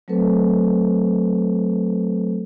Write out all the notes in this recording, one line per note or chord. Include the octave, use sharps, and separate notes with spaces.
F#3 A3 C4 A4 B4 C5